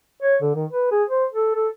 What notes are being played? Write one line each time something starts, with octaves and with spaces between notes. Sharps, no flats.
C#5
D3
D#3
B4
G#4
C5
A4
A4